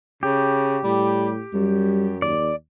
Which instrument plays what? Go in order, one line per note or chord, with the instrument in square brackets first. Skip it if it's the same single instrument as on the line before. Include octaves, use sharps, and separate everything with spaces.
[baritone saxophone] C#3 [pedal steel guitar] G4
[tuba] A2 [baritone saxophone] G3
[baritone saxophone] F#2 [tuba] G3
[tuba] D#2 [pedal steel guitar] D5